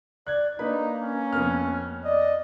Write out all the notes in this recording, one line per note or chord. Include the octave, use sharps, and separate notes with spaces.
D5 F#6 G#6
A#3 D4 D#4 B4 B5
C#4
F2 B3 F6
D5 D#5